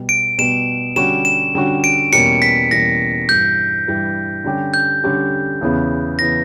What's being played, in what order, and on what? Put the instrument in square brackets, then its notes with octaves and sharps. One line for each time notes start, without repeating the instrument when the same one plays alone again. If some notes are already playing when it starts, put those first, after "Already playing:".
Already playing: [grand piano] B2 G3 B3
[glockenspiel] D7
[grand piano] B2 G3 B3 [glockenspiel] E7
[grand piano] D3 G3 C#4 F#4 [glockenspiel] E7
[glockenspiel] E7
[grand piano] D3 G3 C#4 F#4
[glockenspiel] D7
[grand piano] E2 B2 G3 A#3 C#4 [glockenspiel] C#7
[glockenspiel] B6
[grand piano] E2 B2 G3 A#3 C#4 [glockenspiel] A#6
[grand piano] G2 E3 G3 [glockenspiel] G6
[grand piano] G2 E3 G3
D3 G3 C#4 G4
[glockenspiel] G6
[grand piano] D3 G3 C#4 G4
E2 C#3 E3 B3
[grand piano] C#3 E3 B3 [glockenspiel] A#6